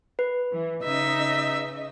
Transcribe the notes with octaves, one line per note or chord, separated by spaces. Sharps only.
B4
E3
C#3 D#4 D#5 E5